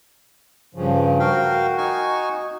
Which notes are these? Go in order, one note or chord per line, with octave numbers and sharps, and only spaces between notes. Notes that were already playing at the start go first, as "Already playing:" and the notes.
G2 C#3 F3
F#4 A#4 F5 G5
D#4 G#5 C#6